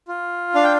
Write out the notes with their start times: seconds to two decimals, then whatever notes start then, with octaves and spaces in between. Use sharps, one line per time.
0.08 F4
0.55 D4 F5
0.64 G5